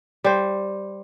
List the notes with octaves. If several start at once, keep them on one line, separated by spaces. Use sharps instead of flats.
G3 C5